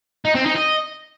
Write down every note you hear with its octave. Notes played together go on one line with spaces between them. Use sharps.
D#4
C4
D#4
D#5